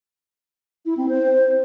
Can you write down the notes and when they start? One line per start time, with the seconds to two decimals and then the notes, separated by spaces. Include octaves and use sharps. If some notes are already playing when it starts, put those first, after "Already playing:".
0.85 E4
0.97 C4
1.09 C5